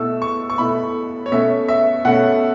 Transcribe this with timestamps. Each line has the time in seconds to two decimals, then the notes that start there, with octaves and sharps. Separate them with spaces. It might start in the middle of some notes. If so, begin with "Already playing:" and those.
Already playing: B2 A3 E4 E6
0.22 C#6
0.50 C#6
0.58 B2 A3 E4 B5
1.26 C#5
1.31 B2 A3 C#4 E5
1.68 E5
2.05 B2 A3 C#4 F#5